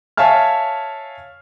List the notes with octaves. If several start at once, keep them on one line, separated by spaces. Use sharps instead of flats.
C#5 E5 F5 G#5 A5 F6